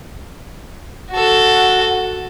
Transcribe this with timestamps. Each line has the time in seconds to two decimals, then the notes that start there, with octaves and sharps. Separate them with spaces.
1.11 F#4 A4